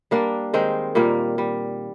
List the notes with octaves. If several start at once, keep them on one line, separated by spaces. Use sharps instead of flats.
G3 A#3 D4
D#3 G#3 C4
A#2 G3 A#3
G3